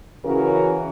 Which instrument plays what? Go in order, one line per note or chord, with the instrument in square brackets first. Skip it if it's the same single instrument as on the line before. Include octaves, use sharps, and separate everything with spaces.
[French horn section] C#3 E3 C#4 F#4 A#4